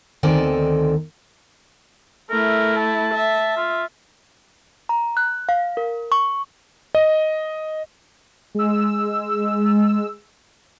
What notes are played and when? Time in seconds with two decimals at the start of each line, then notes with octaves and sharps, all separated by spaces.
0.23 D2 D#3 C4 A4 D5 G#5
2.30 A3 E4 A#4
2.76 A5
3.14 E5
3.57 F4
4.89 A#5
5.17 F#6
5.49 F5
5.77 A#4
6.12 C#6
6.95 D#5
8.55 G#3 E6